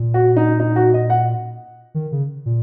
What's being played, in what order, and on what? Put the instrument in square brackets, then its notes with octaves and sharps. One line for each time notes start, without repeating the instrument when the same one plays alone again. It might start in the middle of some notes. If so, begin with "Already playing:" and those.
Already playing: [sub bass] A#2
[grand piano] F#4
D#4
D#4
F#4
D#5
F#5
[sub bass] D#3
C#3
A#2